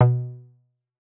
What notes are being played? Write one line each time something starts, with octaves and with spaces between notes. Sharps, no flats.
B2